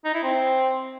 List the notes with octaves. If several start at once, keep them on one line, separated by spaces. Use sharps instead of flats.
D#4
E4
C4